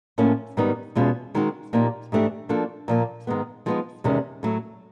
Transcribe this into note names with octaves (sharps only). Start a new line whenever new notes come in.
A2 F3 A#3 C#4
G#2 D#3 G3 B3 D#4
E2 B2 G#3 C#4 F4
D#3 G#3 C4 D#4 F#4
A#2 F3 A#3 D#4 G4
G#2 E3 A3 D4 G4
F3 A#3 D4 F#4 A4
A#2 F3 A#3
G#2 D#3 G#3 B3
F3 G#3 B3 D#4
E2 C3 D#3 G#3 C#4
A2 F#3 A3